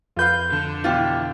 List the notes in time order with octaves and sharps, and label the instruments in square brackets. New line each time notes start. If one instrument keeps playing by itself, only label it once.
[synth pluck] F2 G6 [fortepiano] F4 B4 F5
[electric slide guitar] D3
[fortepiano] B2 E3 [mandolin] F4 G4